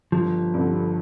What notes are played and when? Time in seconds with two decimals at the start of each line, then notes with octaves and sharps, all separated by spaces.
0.12 G1 F3
0.54 G2 D3